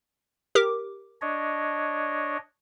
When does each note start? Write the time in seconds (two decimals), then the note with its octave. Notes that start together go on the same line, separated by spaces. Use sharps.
0.55 G4 A#4 D6
1.21 D4 C#5 D#5